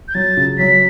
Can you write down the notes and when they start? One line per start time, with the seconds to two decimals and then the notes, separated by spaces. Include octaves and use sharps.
0.08 G6
0.14 F#3 A6
0.37 C#3
0.58 F#3 B6